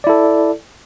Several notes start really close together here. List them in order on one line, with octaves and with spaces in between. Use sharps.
D5 E4 A4